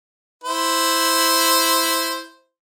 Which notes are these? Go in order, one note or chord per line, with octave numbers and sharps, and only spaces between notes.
E4 C5